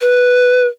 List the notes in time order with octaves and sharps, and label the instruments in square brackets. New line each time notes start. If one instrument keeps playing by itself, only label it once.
[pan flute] B4